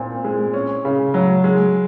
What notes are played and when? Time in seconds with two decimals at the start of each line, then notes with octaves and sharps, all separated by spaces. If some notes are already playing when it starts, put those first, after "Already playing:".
Already playing: A#2 C4
0.24 G#3
0.54 C#4
0.85 C#3
1.14 F#3
1.44 G#3